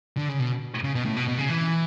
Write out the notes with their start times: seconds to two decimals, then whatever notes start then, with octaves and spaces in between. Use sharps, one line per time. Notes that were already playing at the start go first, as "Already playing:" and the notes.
0.17 D3
0.29 C#3
0.39 B2
0.83 C#3
0.94 B2
1.05 A2
1.17 B2
1.28 B2
1.38 C#3
1.49 E3